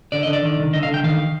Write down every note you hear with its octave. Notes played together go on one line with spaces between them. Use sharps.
D3 D5
D3 D#5
D5
D#3
C2
D3 D#5
F5
D3 G5
D#3 F5